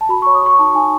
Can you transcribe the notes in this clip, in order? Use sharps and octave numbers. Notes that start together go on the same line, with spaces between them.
A5
F#4 B5
C#5 C#6
D#6
F#4 C#6
D#4 A5
D#4 G#5